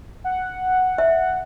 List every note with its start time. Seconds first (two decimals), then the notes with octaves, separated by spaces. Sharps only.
0.24 F#5
0.98 E5